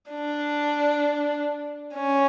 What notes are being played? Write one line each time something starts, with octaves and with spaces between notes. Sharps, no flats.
D4
C#4